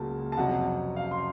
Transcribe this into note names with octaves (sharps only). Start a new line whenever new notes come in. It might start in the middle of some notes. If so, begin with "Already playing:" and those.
Already playing: C#2 C#3 F#3 A#3 A5
A5
F2 C3 F#3 F#5
F5
C6